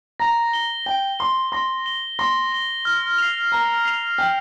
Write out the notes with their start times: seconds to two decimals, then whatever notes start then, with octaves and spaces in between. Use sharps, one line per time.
0.19 A#5 A#6
0.53 G7
0.86 G5 A#6
1.19 C6 G7
1.52 C6 A#6
1.86 G7
2.19 C6 A#6
2.52 G7
2.85 F6
3.18 C7 F7
3.52 A#5 F6
3.85 C7 F7
4.18 G5 F6